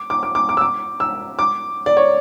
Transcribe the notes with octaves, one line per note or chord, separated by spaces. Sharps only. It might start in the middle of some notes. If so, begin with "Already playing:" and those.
Already playing: D6
D6
D6
D6
D6
E6
D6
E6
D6
D5
C#5